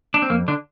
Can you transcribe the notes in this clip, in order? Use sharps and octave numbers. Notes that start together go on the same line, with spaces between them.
D4
C4
F2 A#3
D3 D4